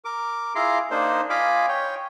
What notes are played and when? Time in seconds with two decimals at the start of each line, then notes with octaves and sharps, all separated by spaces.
0.05 A#4 D6
0.55 E4 F4 G#4 A#5 C6 D6
0.91 A#3 D4 D#4 C5
1.30 F4 D#5 F5 G#5 B5 D6
1.69 C#5 G5